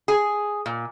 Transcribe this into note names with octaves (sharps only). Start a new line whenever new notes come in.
G#4
A#2